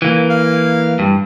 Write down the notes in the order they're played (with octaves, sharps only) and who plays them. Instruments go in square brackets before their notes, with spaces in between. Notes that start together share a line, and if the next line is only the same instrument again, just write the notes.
[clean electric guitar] E3 A#3
[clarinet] F5
[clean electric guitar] G2